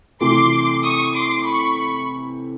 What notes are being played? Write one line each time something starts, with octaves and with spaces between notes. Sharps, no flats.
C3 E3 A3 C6 D6
C#6 D#6
C6 D6
B5 C#6